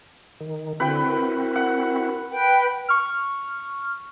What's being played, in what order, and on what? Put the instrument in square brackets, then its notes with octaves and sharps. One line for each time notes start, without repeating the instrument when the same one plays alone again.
[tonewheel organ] D#3
[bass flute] D3 [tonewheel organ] C4 E4 F#4 [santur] B4 G5
[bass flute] A#4
[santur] F#5
[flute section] B4 G5
[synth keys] C#6 F6